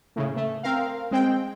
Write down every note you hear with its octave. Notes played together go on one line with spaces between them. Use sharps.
A2 C#3
A3
C4 A#4 F5
G#3 C4 G5